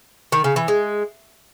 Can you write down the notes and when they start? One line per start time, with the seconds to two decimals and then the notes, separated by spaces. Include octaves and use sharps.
0.32 D#3
0.44 C#3
0.56 E3
0.68 G#3